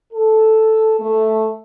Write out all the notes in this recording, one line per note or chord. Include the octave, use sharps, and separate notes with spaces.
A4
A3